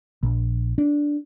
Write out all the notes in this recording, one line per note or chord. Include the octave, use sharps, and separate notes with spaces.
A#1
D4